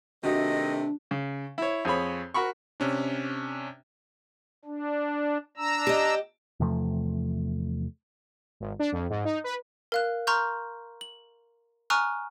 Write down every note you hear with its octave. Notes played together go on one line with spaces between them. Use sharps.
C3 D#3 A3 D4 F#4 D#5
C#3
E4 C#5
F2 G#4 C#5 B5
F#4 A#4 B5 C#6
C3 C#4 D4
D4
D4 A#5 E6
G4 D#5
E2 C3 F3 A3
G#1
D4
F2
G#2
D#4
B4
A#4 F5 F#6
A#5 C6 C#6 F6 G6
F#7
G#5 A#5 C#6 D#6 F6 F#6